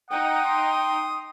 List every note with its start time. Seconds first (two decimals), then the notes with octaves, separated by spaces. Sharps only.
0.11 D#4 F#5 G5 D#6
0.45 C6